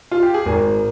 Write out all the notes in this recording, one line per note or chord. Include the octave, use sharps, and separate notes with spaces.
F4
G4
G#4
G#1 A#4